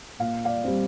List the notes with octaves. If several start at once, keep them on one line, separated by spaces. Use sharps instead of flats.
A#2 F5
D5 F5
G3 C4